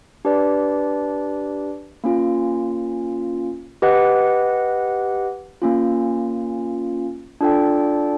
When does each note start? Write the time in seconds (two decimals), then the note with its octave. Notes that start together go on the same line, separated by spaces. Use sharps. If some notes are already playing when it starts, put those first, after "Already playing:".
0.25 D4 G4 B4 D5
2.04 A#3 C#4 F4
3.82 G4 B4 D#5 F#5
5.62 A#3 C#4 F4
7.41 D4 F4 A4 D5 G5